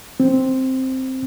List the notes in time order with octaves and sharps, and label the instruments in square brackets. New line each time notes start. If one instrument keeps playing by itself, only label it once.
[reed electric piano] C4